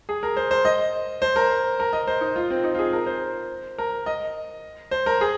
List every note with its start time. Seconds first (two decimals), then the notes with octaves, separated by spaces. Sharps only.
0.09 G#4
0.23 A#4
0.36 C5
0.51 C5
0.65 D#5
1.22 C5
1.36 A#4
1.80 A#4
1.93 D#5
2.07 C5
2.21 D#4
2.36 F4
2.50 C4
2.64 D#4
2.75 F4
2.79 G#4
2.93 A#4
3.06 C5
3.78 A#4
4.06 D#5
4.91 C5
5.06 A#4
5.21 G#4